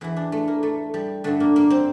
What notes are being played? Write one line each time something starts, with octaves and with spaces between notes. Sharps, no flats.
E2 E3 E4
D4
A3
A#3
A3
G3
G2 D3 A3
A#3
A#3
C4